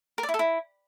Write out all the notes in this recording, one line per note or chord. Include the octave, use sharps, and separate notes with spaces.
A#4
D5
E4
A4
E4